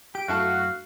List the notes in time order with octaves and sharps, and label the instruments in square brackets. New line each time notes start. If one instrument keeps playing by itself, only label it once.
[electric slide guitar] G4 [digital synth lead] D7
[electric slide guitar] F#2 A3 [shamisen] D3 E4 A4 [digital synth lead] F#4 [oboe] F5